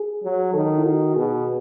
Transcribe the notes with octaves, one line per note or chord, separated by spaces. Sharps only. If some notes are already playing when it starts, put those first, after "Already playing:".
Already playing: G#4
F#3
D#3 A4
E4
D#3 F#4
B2 G#4